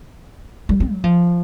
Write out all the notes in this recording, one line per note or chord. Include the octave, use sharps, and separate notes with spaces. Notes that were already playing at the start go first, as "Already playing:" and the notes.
G3
C4
F#3
F3